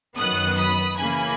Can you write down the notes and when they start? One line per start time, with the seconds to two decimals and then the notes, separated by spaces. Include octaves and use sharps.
0.17 F#2 D#3 F#3 B3 D#6 F#6
0.57 B5 D#6
0.97 C#3 E3 A#3 G#5 B5